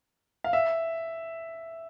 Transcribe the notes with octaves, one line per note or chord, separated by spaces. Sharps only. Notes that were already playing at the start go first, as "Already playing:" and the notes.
F5
E5